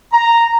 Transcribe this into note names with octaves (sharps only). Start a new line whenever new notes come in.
A#5